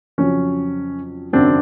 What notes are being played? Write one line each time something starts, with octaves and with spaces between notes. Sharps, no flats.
F2 C#3 F#3 C#4
G#1 F#2 C#3 F#3 C4 D4